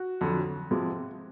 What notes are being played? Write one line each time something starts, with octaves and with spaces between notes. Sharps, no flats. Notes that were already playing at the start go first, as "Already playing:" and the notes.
Already playing: F#4
F2 D3 F#3
C3 F3 G#3